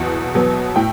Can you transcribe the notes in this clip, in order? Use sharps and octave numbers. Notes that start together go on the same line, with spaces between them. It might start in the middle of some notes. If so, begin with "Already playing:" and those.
Already playing: E2 B2 F#3
B2 F#3 B3
A2 G5